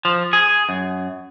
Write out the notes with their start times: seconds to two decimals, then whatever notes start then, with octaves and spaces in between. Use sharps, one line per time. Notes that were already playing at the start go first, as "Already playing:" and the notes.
0.05 F3
0.33 G#4
0.69 F#2